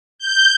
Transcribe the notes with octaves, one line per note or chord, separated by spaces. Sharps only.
G6